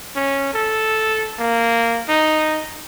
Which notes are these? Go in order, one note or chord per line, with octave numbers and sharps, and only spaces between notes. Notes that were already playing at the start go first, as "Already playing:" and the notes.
C#4
A4
A#3
D#4